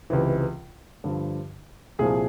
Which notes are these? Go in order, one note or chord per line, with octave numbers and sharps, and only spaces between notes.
C#2 C3 E3
G2 D3 F3
C2 A#2 F3 G#4